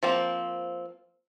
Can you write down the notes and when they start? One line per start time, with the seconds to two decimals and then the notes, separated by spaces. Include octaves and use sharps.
0.03 F3 A#3 C4